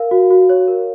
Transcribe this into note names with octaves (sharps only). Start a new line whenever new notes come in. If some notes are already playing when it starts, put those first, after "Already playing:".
Already playing: A#4 F5
F#4
F#4
C#5
A#4